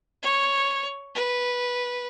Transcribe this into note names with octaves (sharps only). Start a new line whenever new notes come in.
C#5
B4